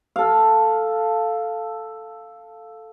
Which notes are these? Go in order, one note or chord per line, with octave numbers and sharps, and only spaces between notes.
A4 F5